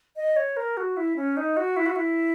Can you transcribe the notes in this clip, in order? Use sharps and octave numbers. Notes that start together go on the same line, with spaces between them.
D#5
C#5
A#4
F#4
E4
C#4
D#4
F#4
E4
F#4
E4